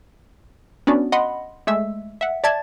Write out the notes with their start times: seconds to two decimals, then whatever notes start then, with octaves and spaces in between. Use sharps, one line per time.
0.87 B3 C#4 D4 F#4 D5
1.12 D#5 F#5 B5 C6
1.67 G#3 A3 E5 E6
2.21 E5 F#5
2.44 D5 E5 A5 G#6 A6